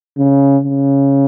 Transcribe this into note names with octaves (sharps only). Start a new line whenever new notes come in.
C#3
C#3